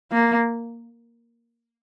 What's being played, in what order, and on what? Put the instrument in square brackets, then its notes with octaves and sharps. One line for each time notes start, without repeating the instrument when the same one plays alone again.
[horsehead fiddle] A#3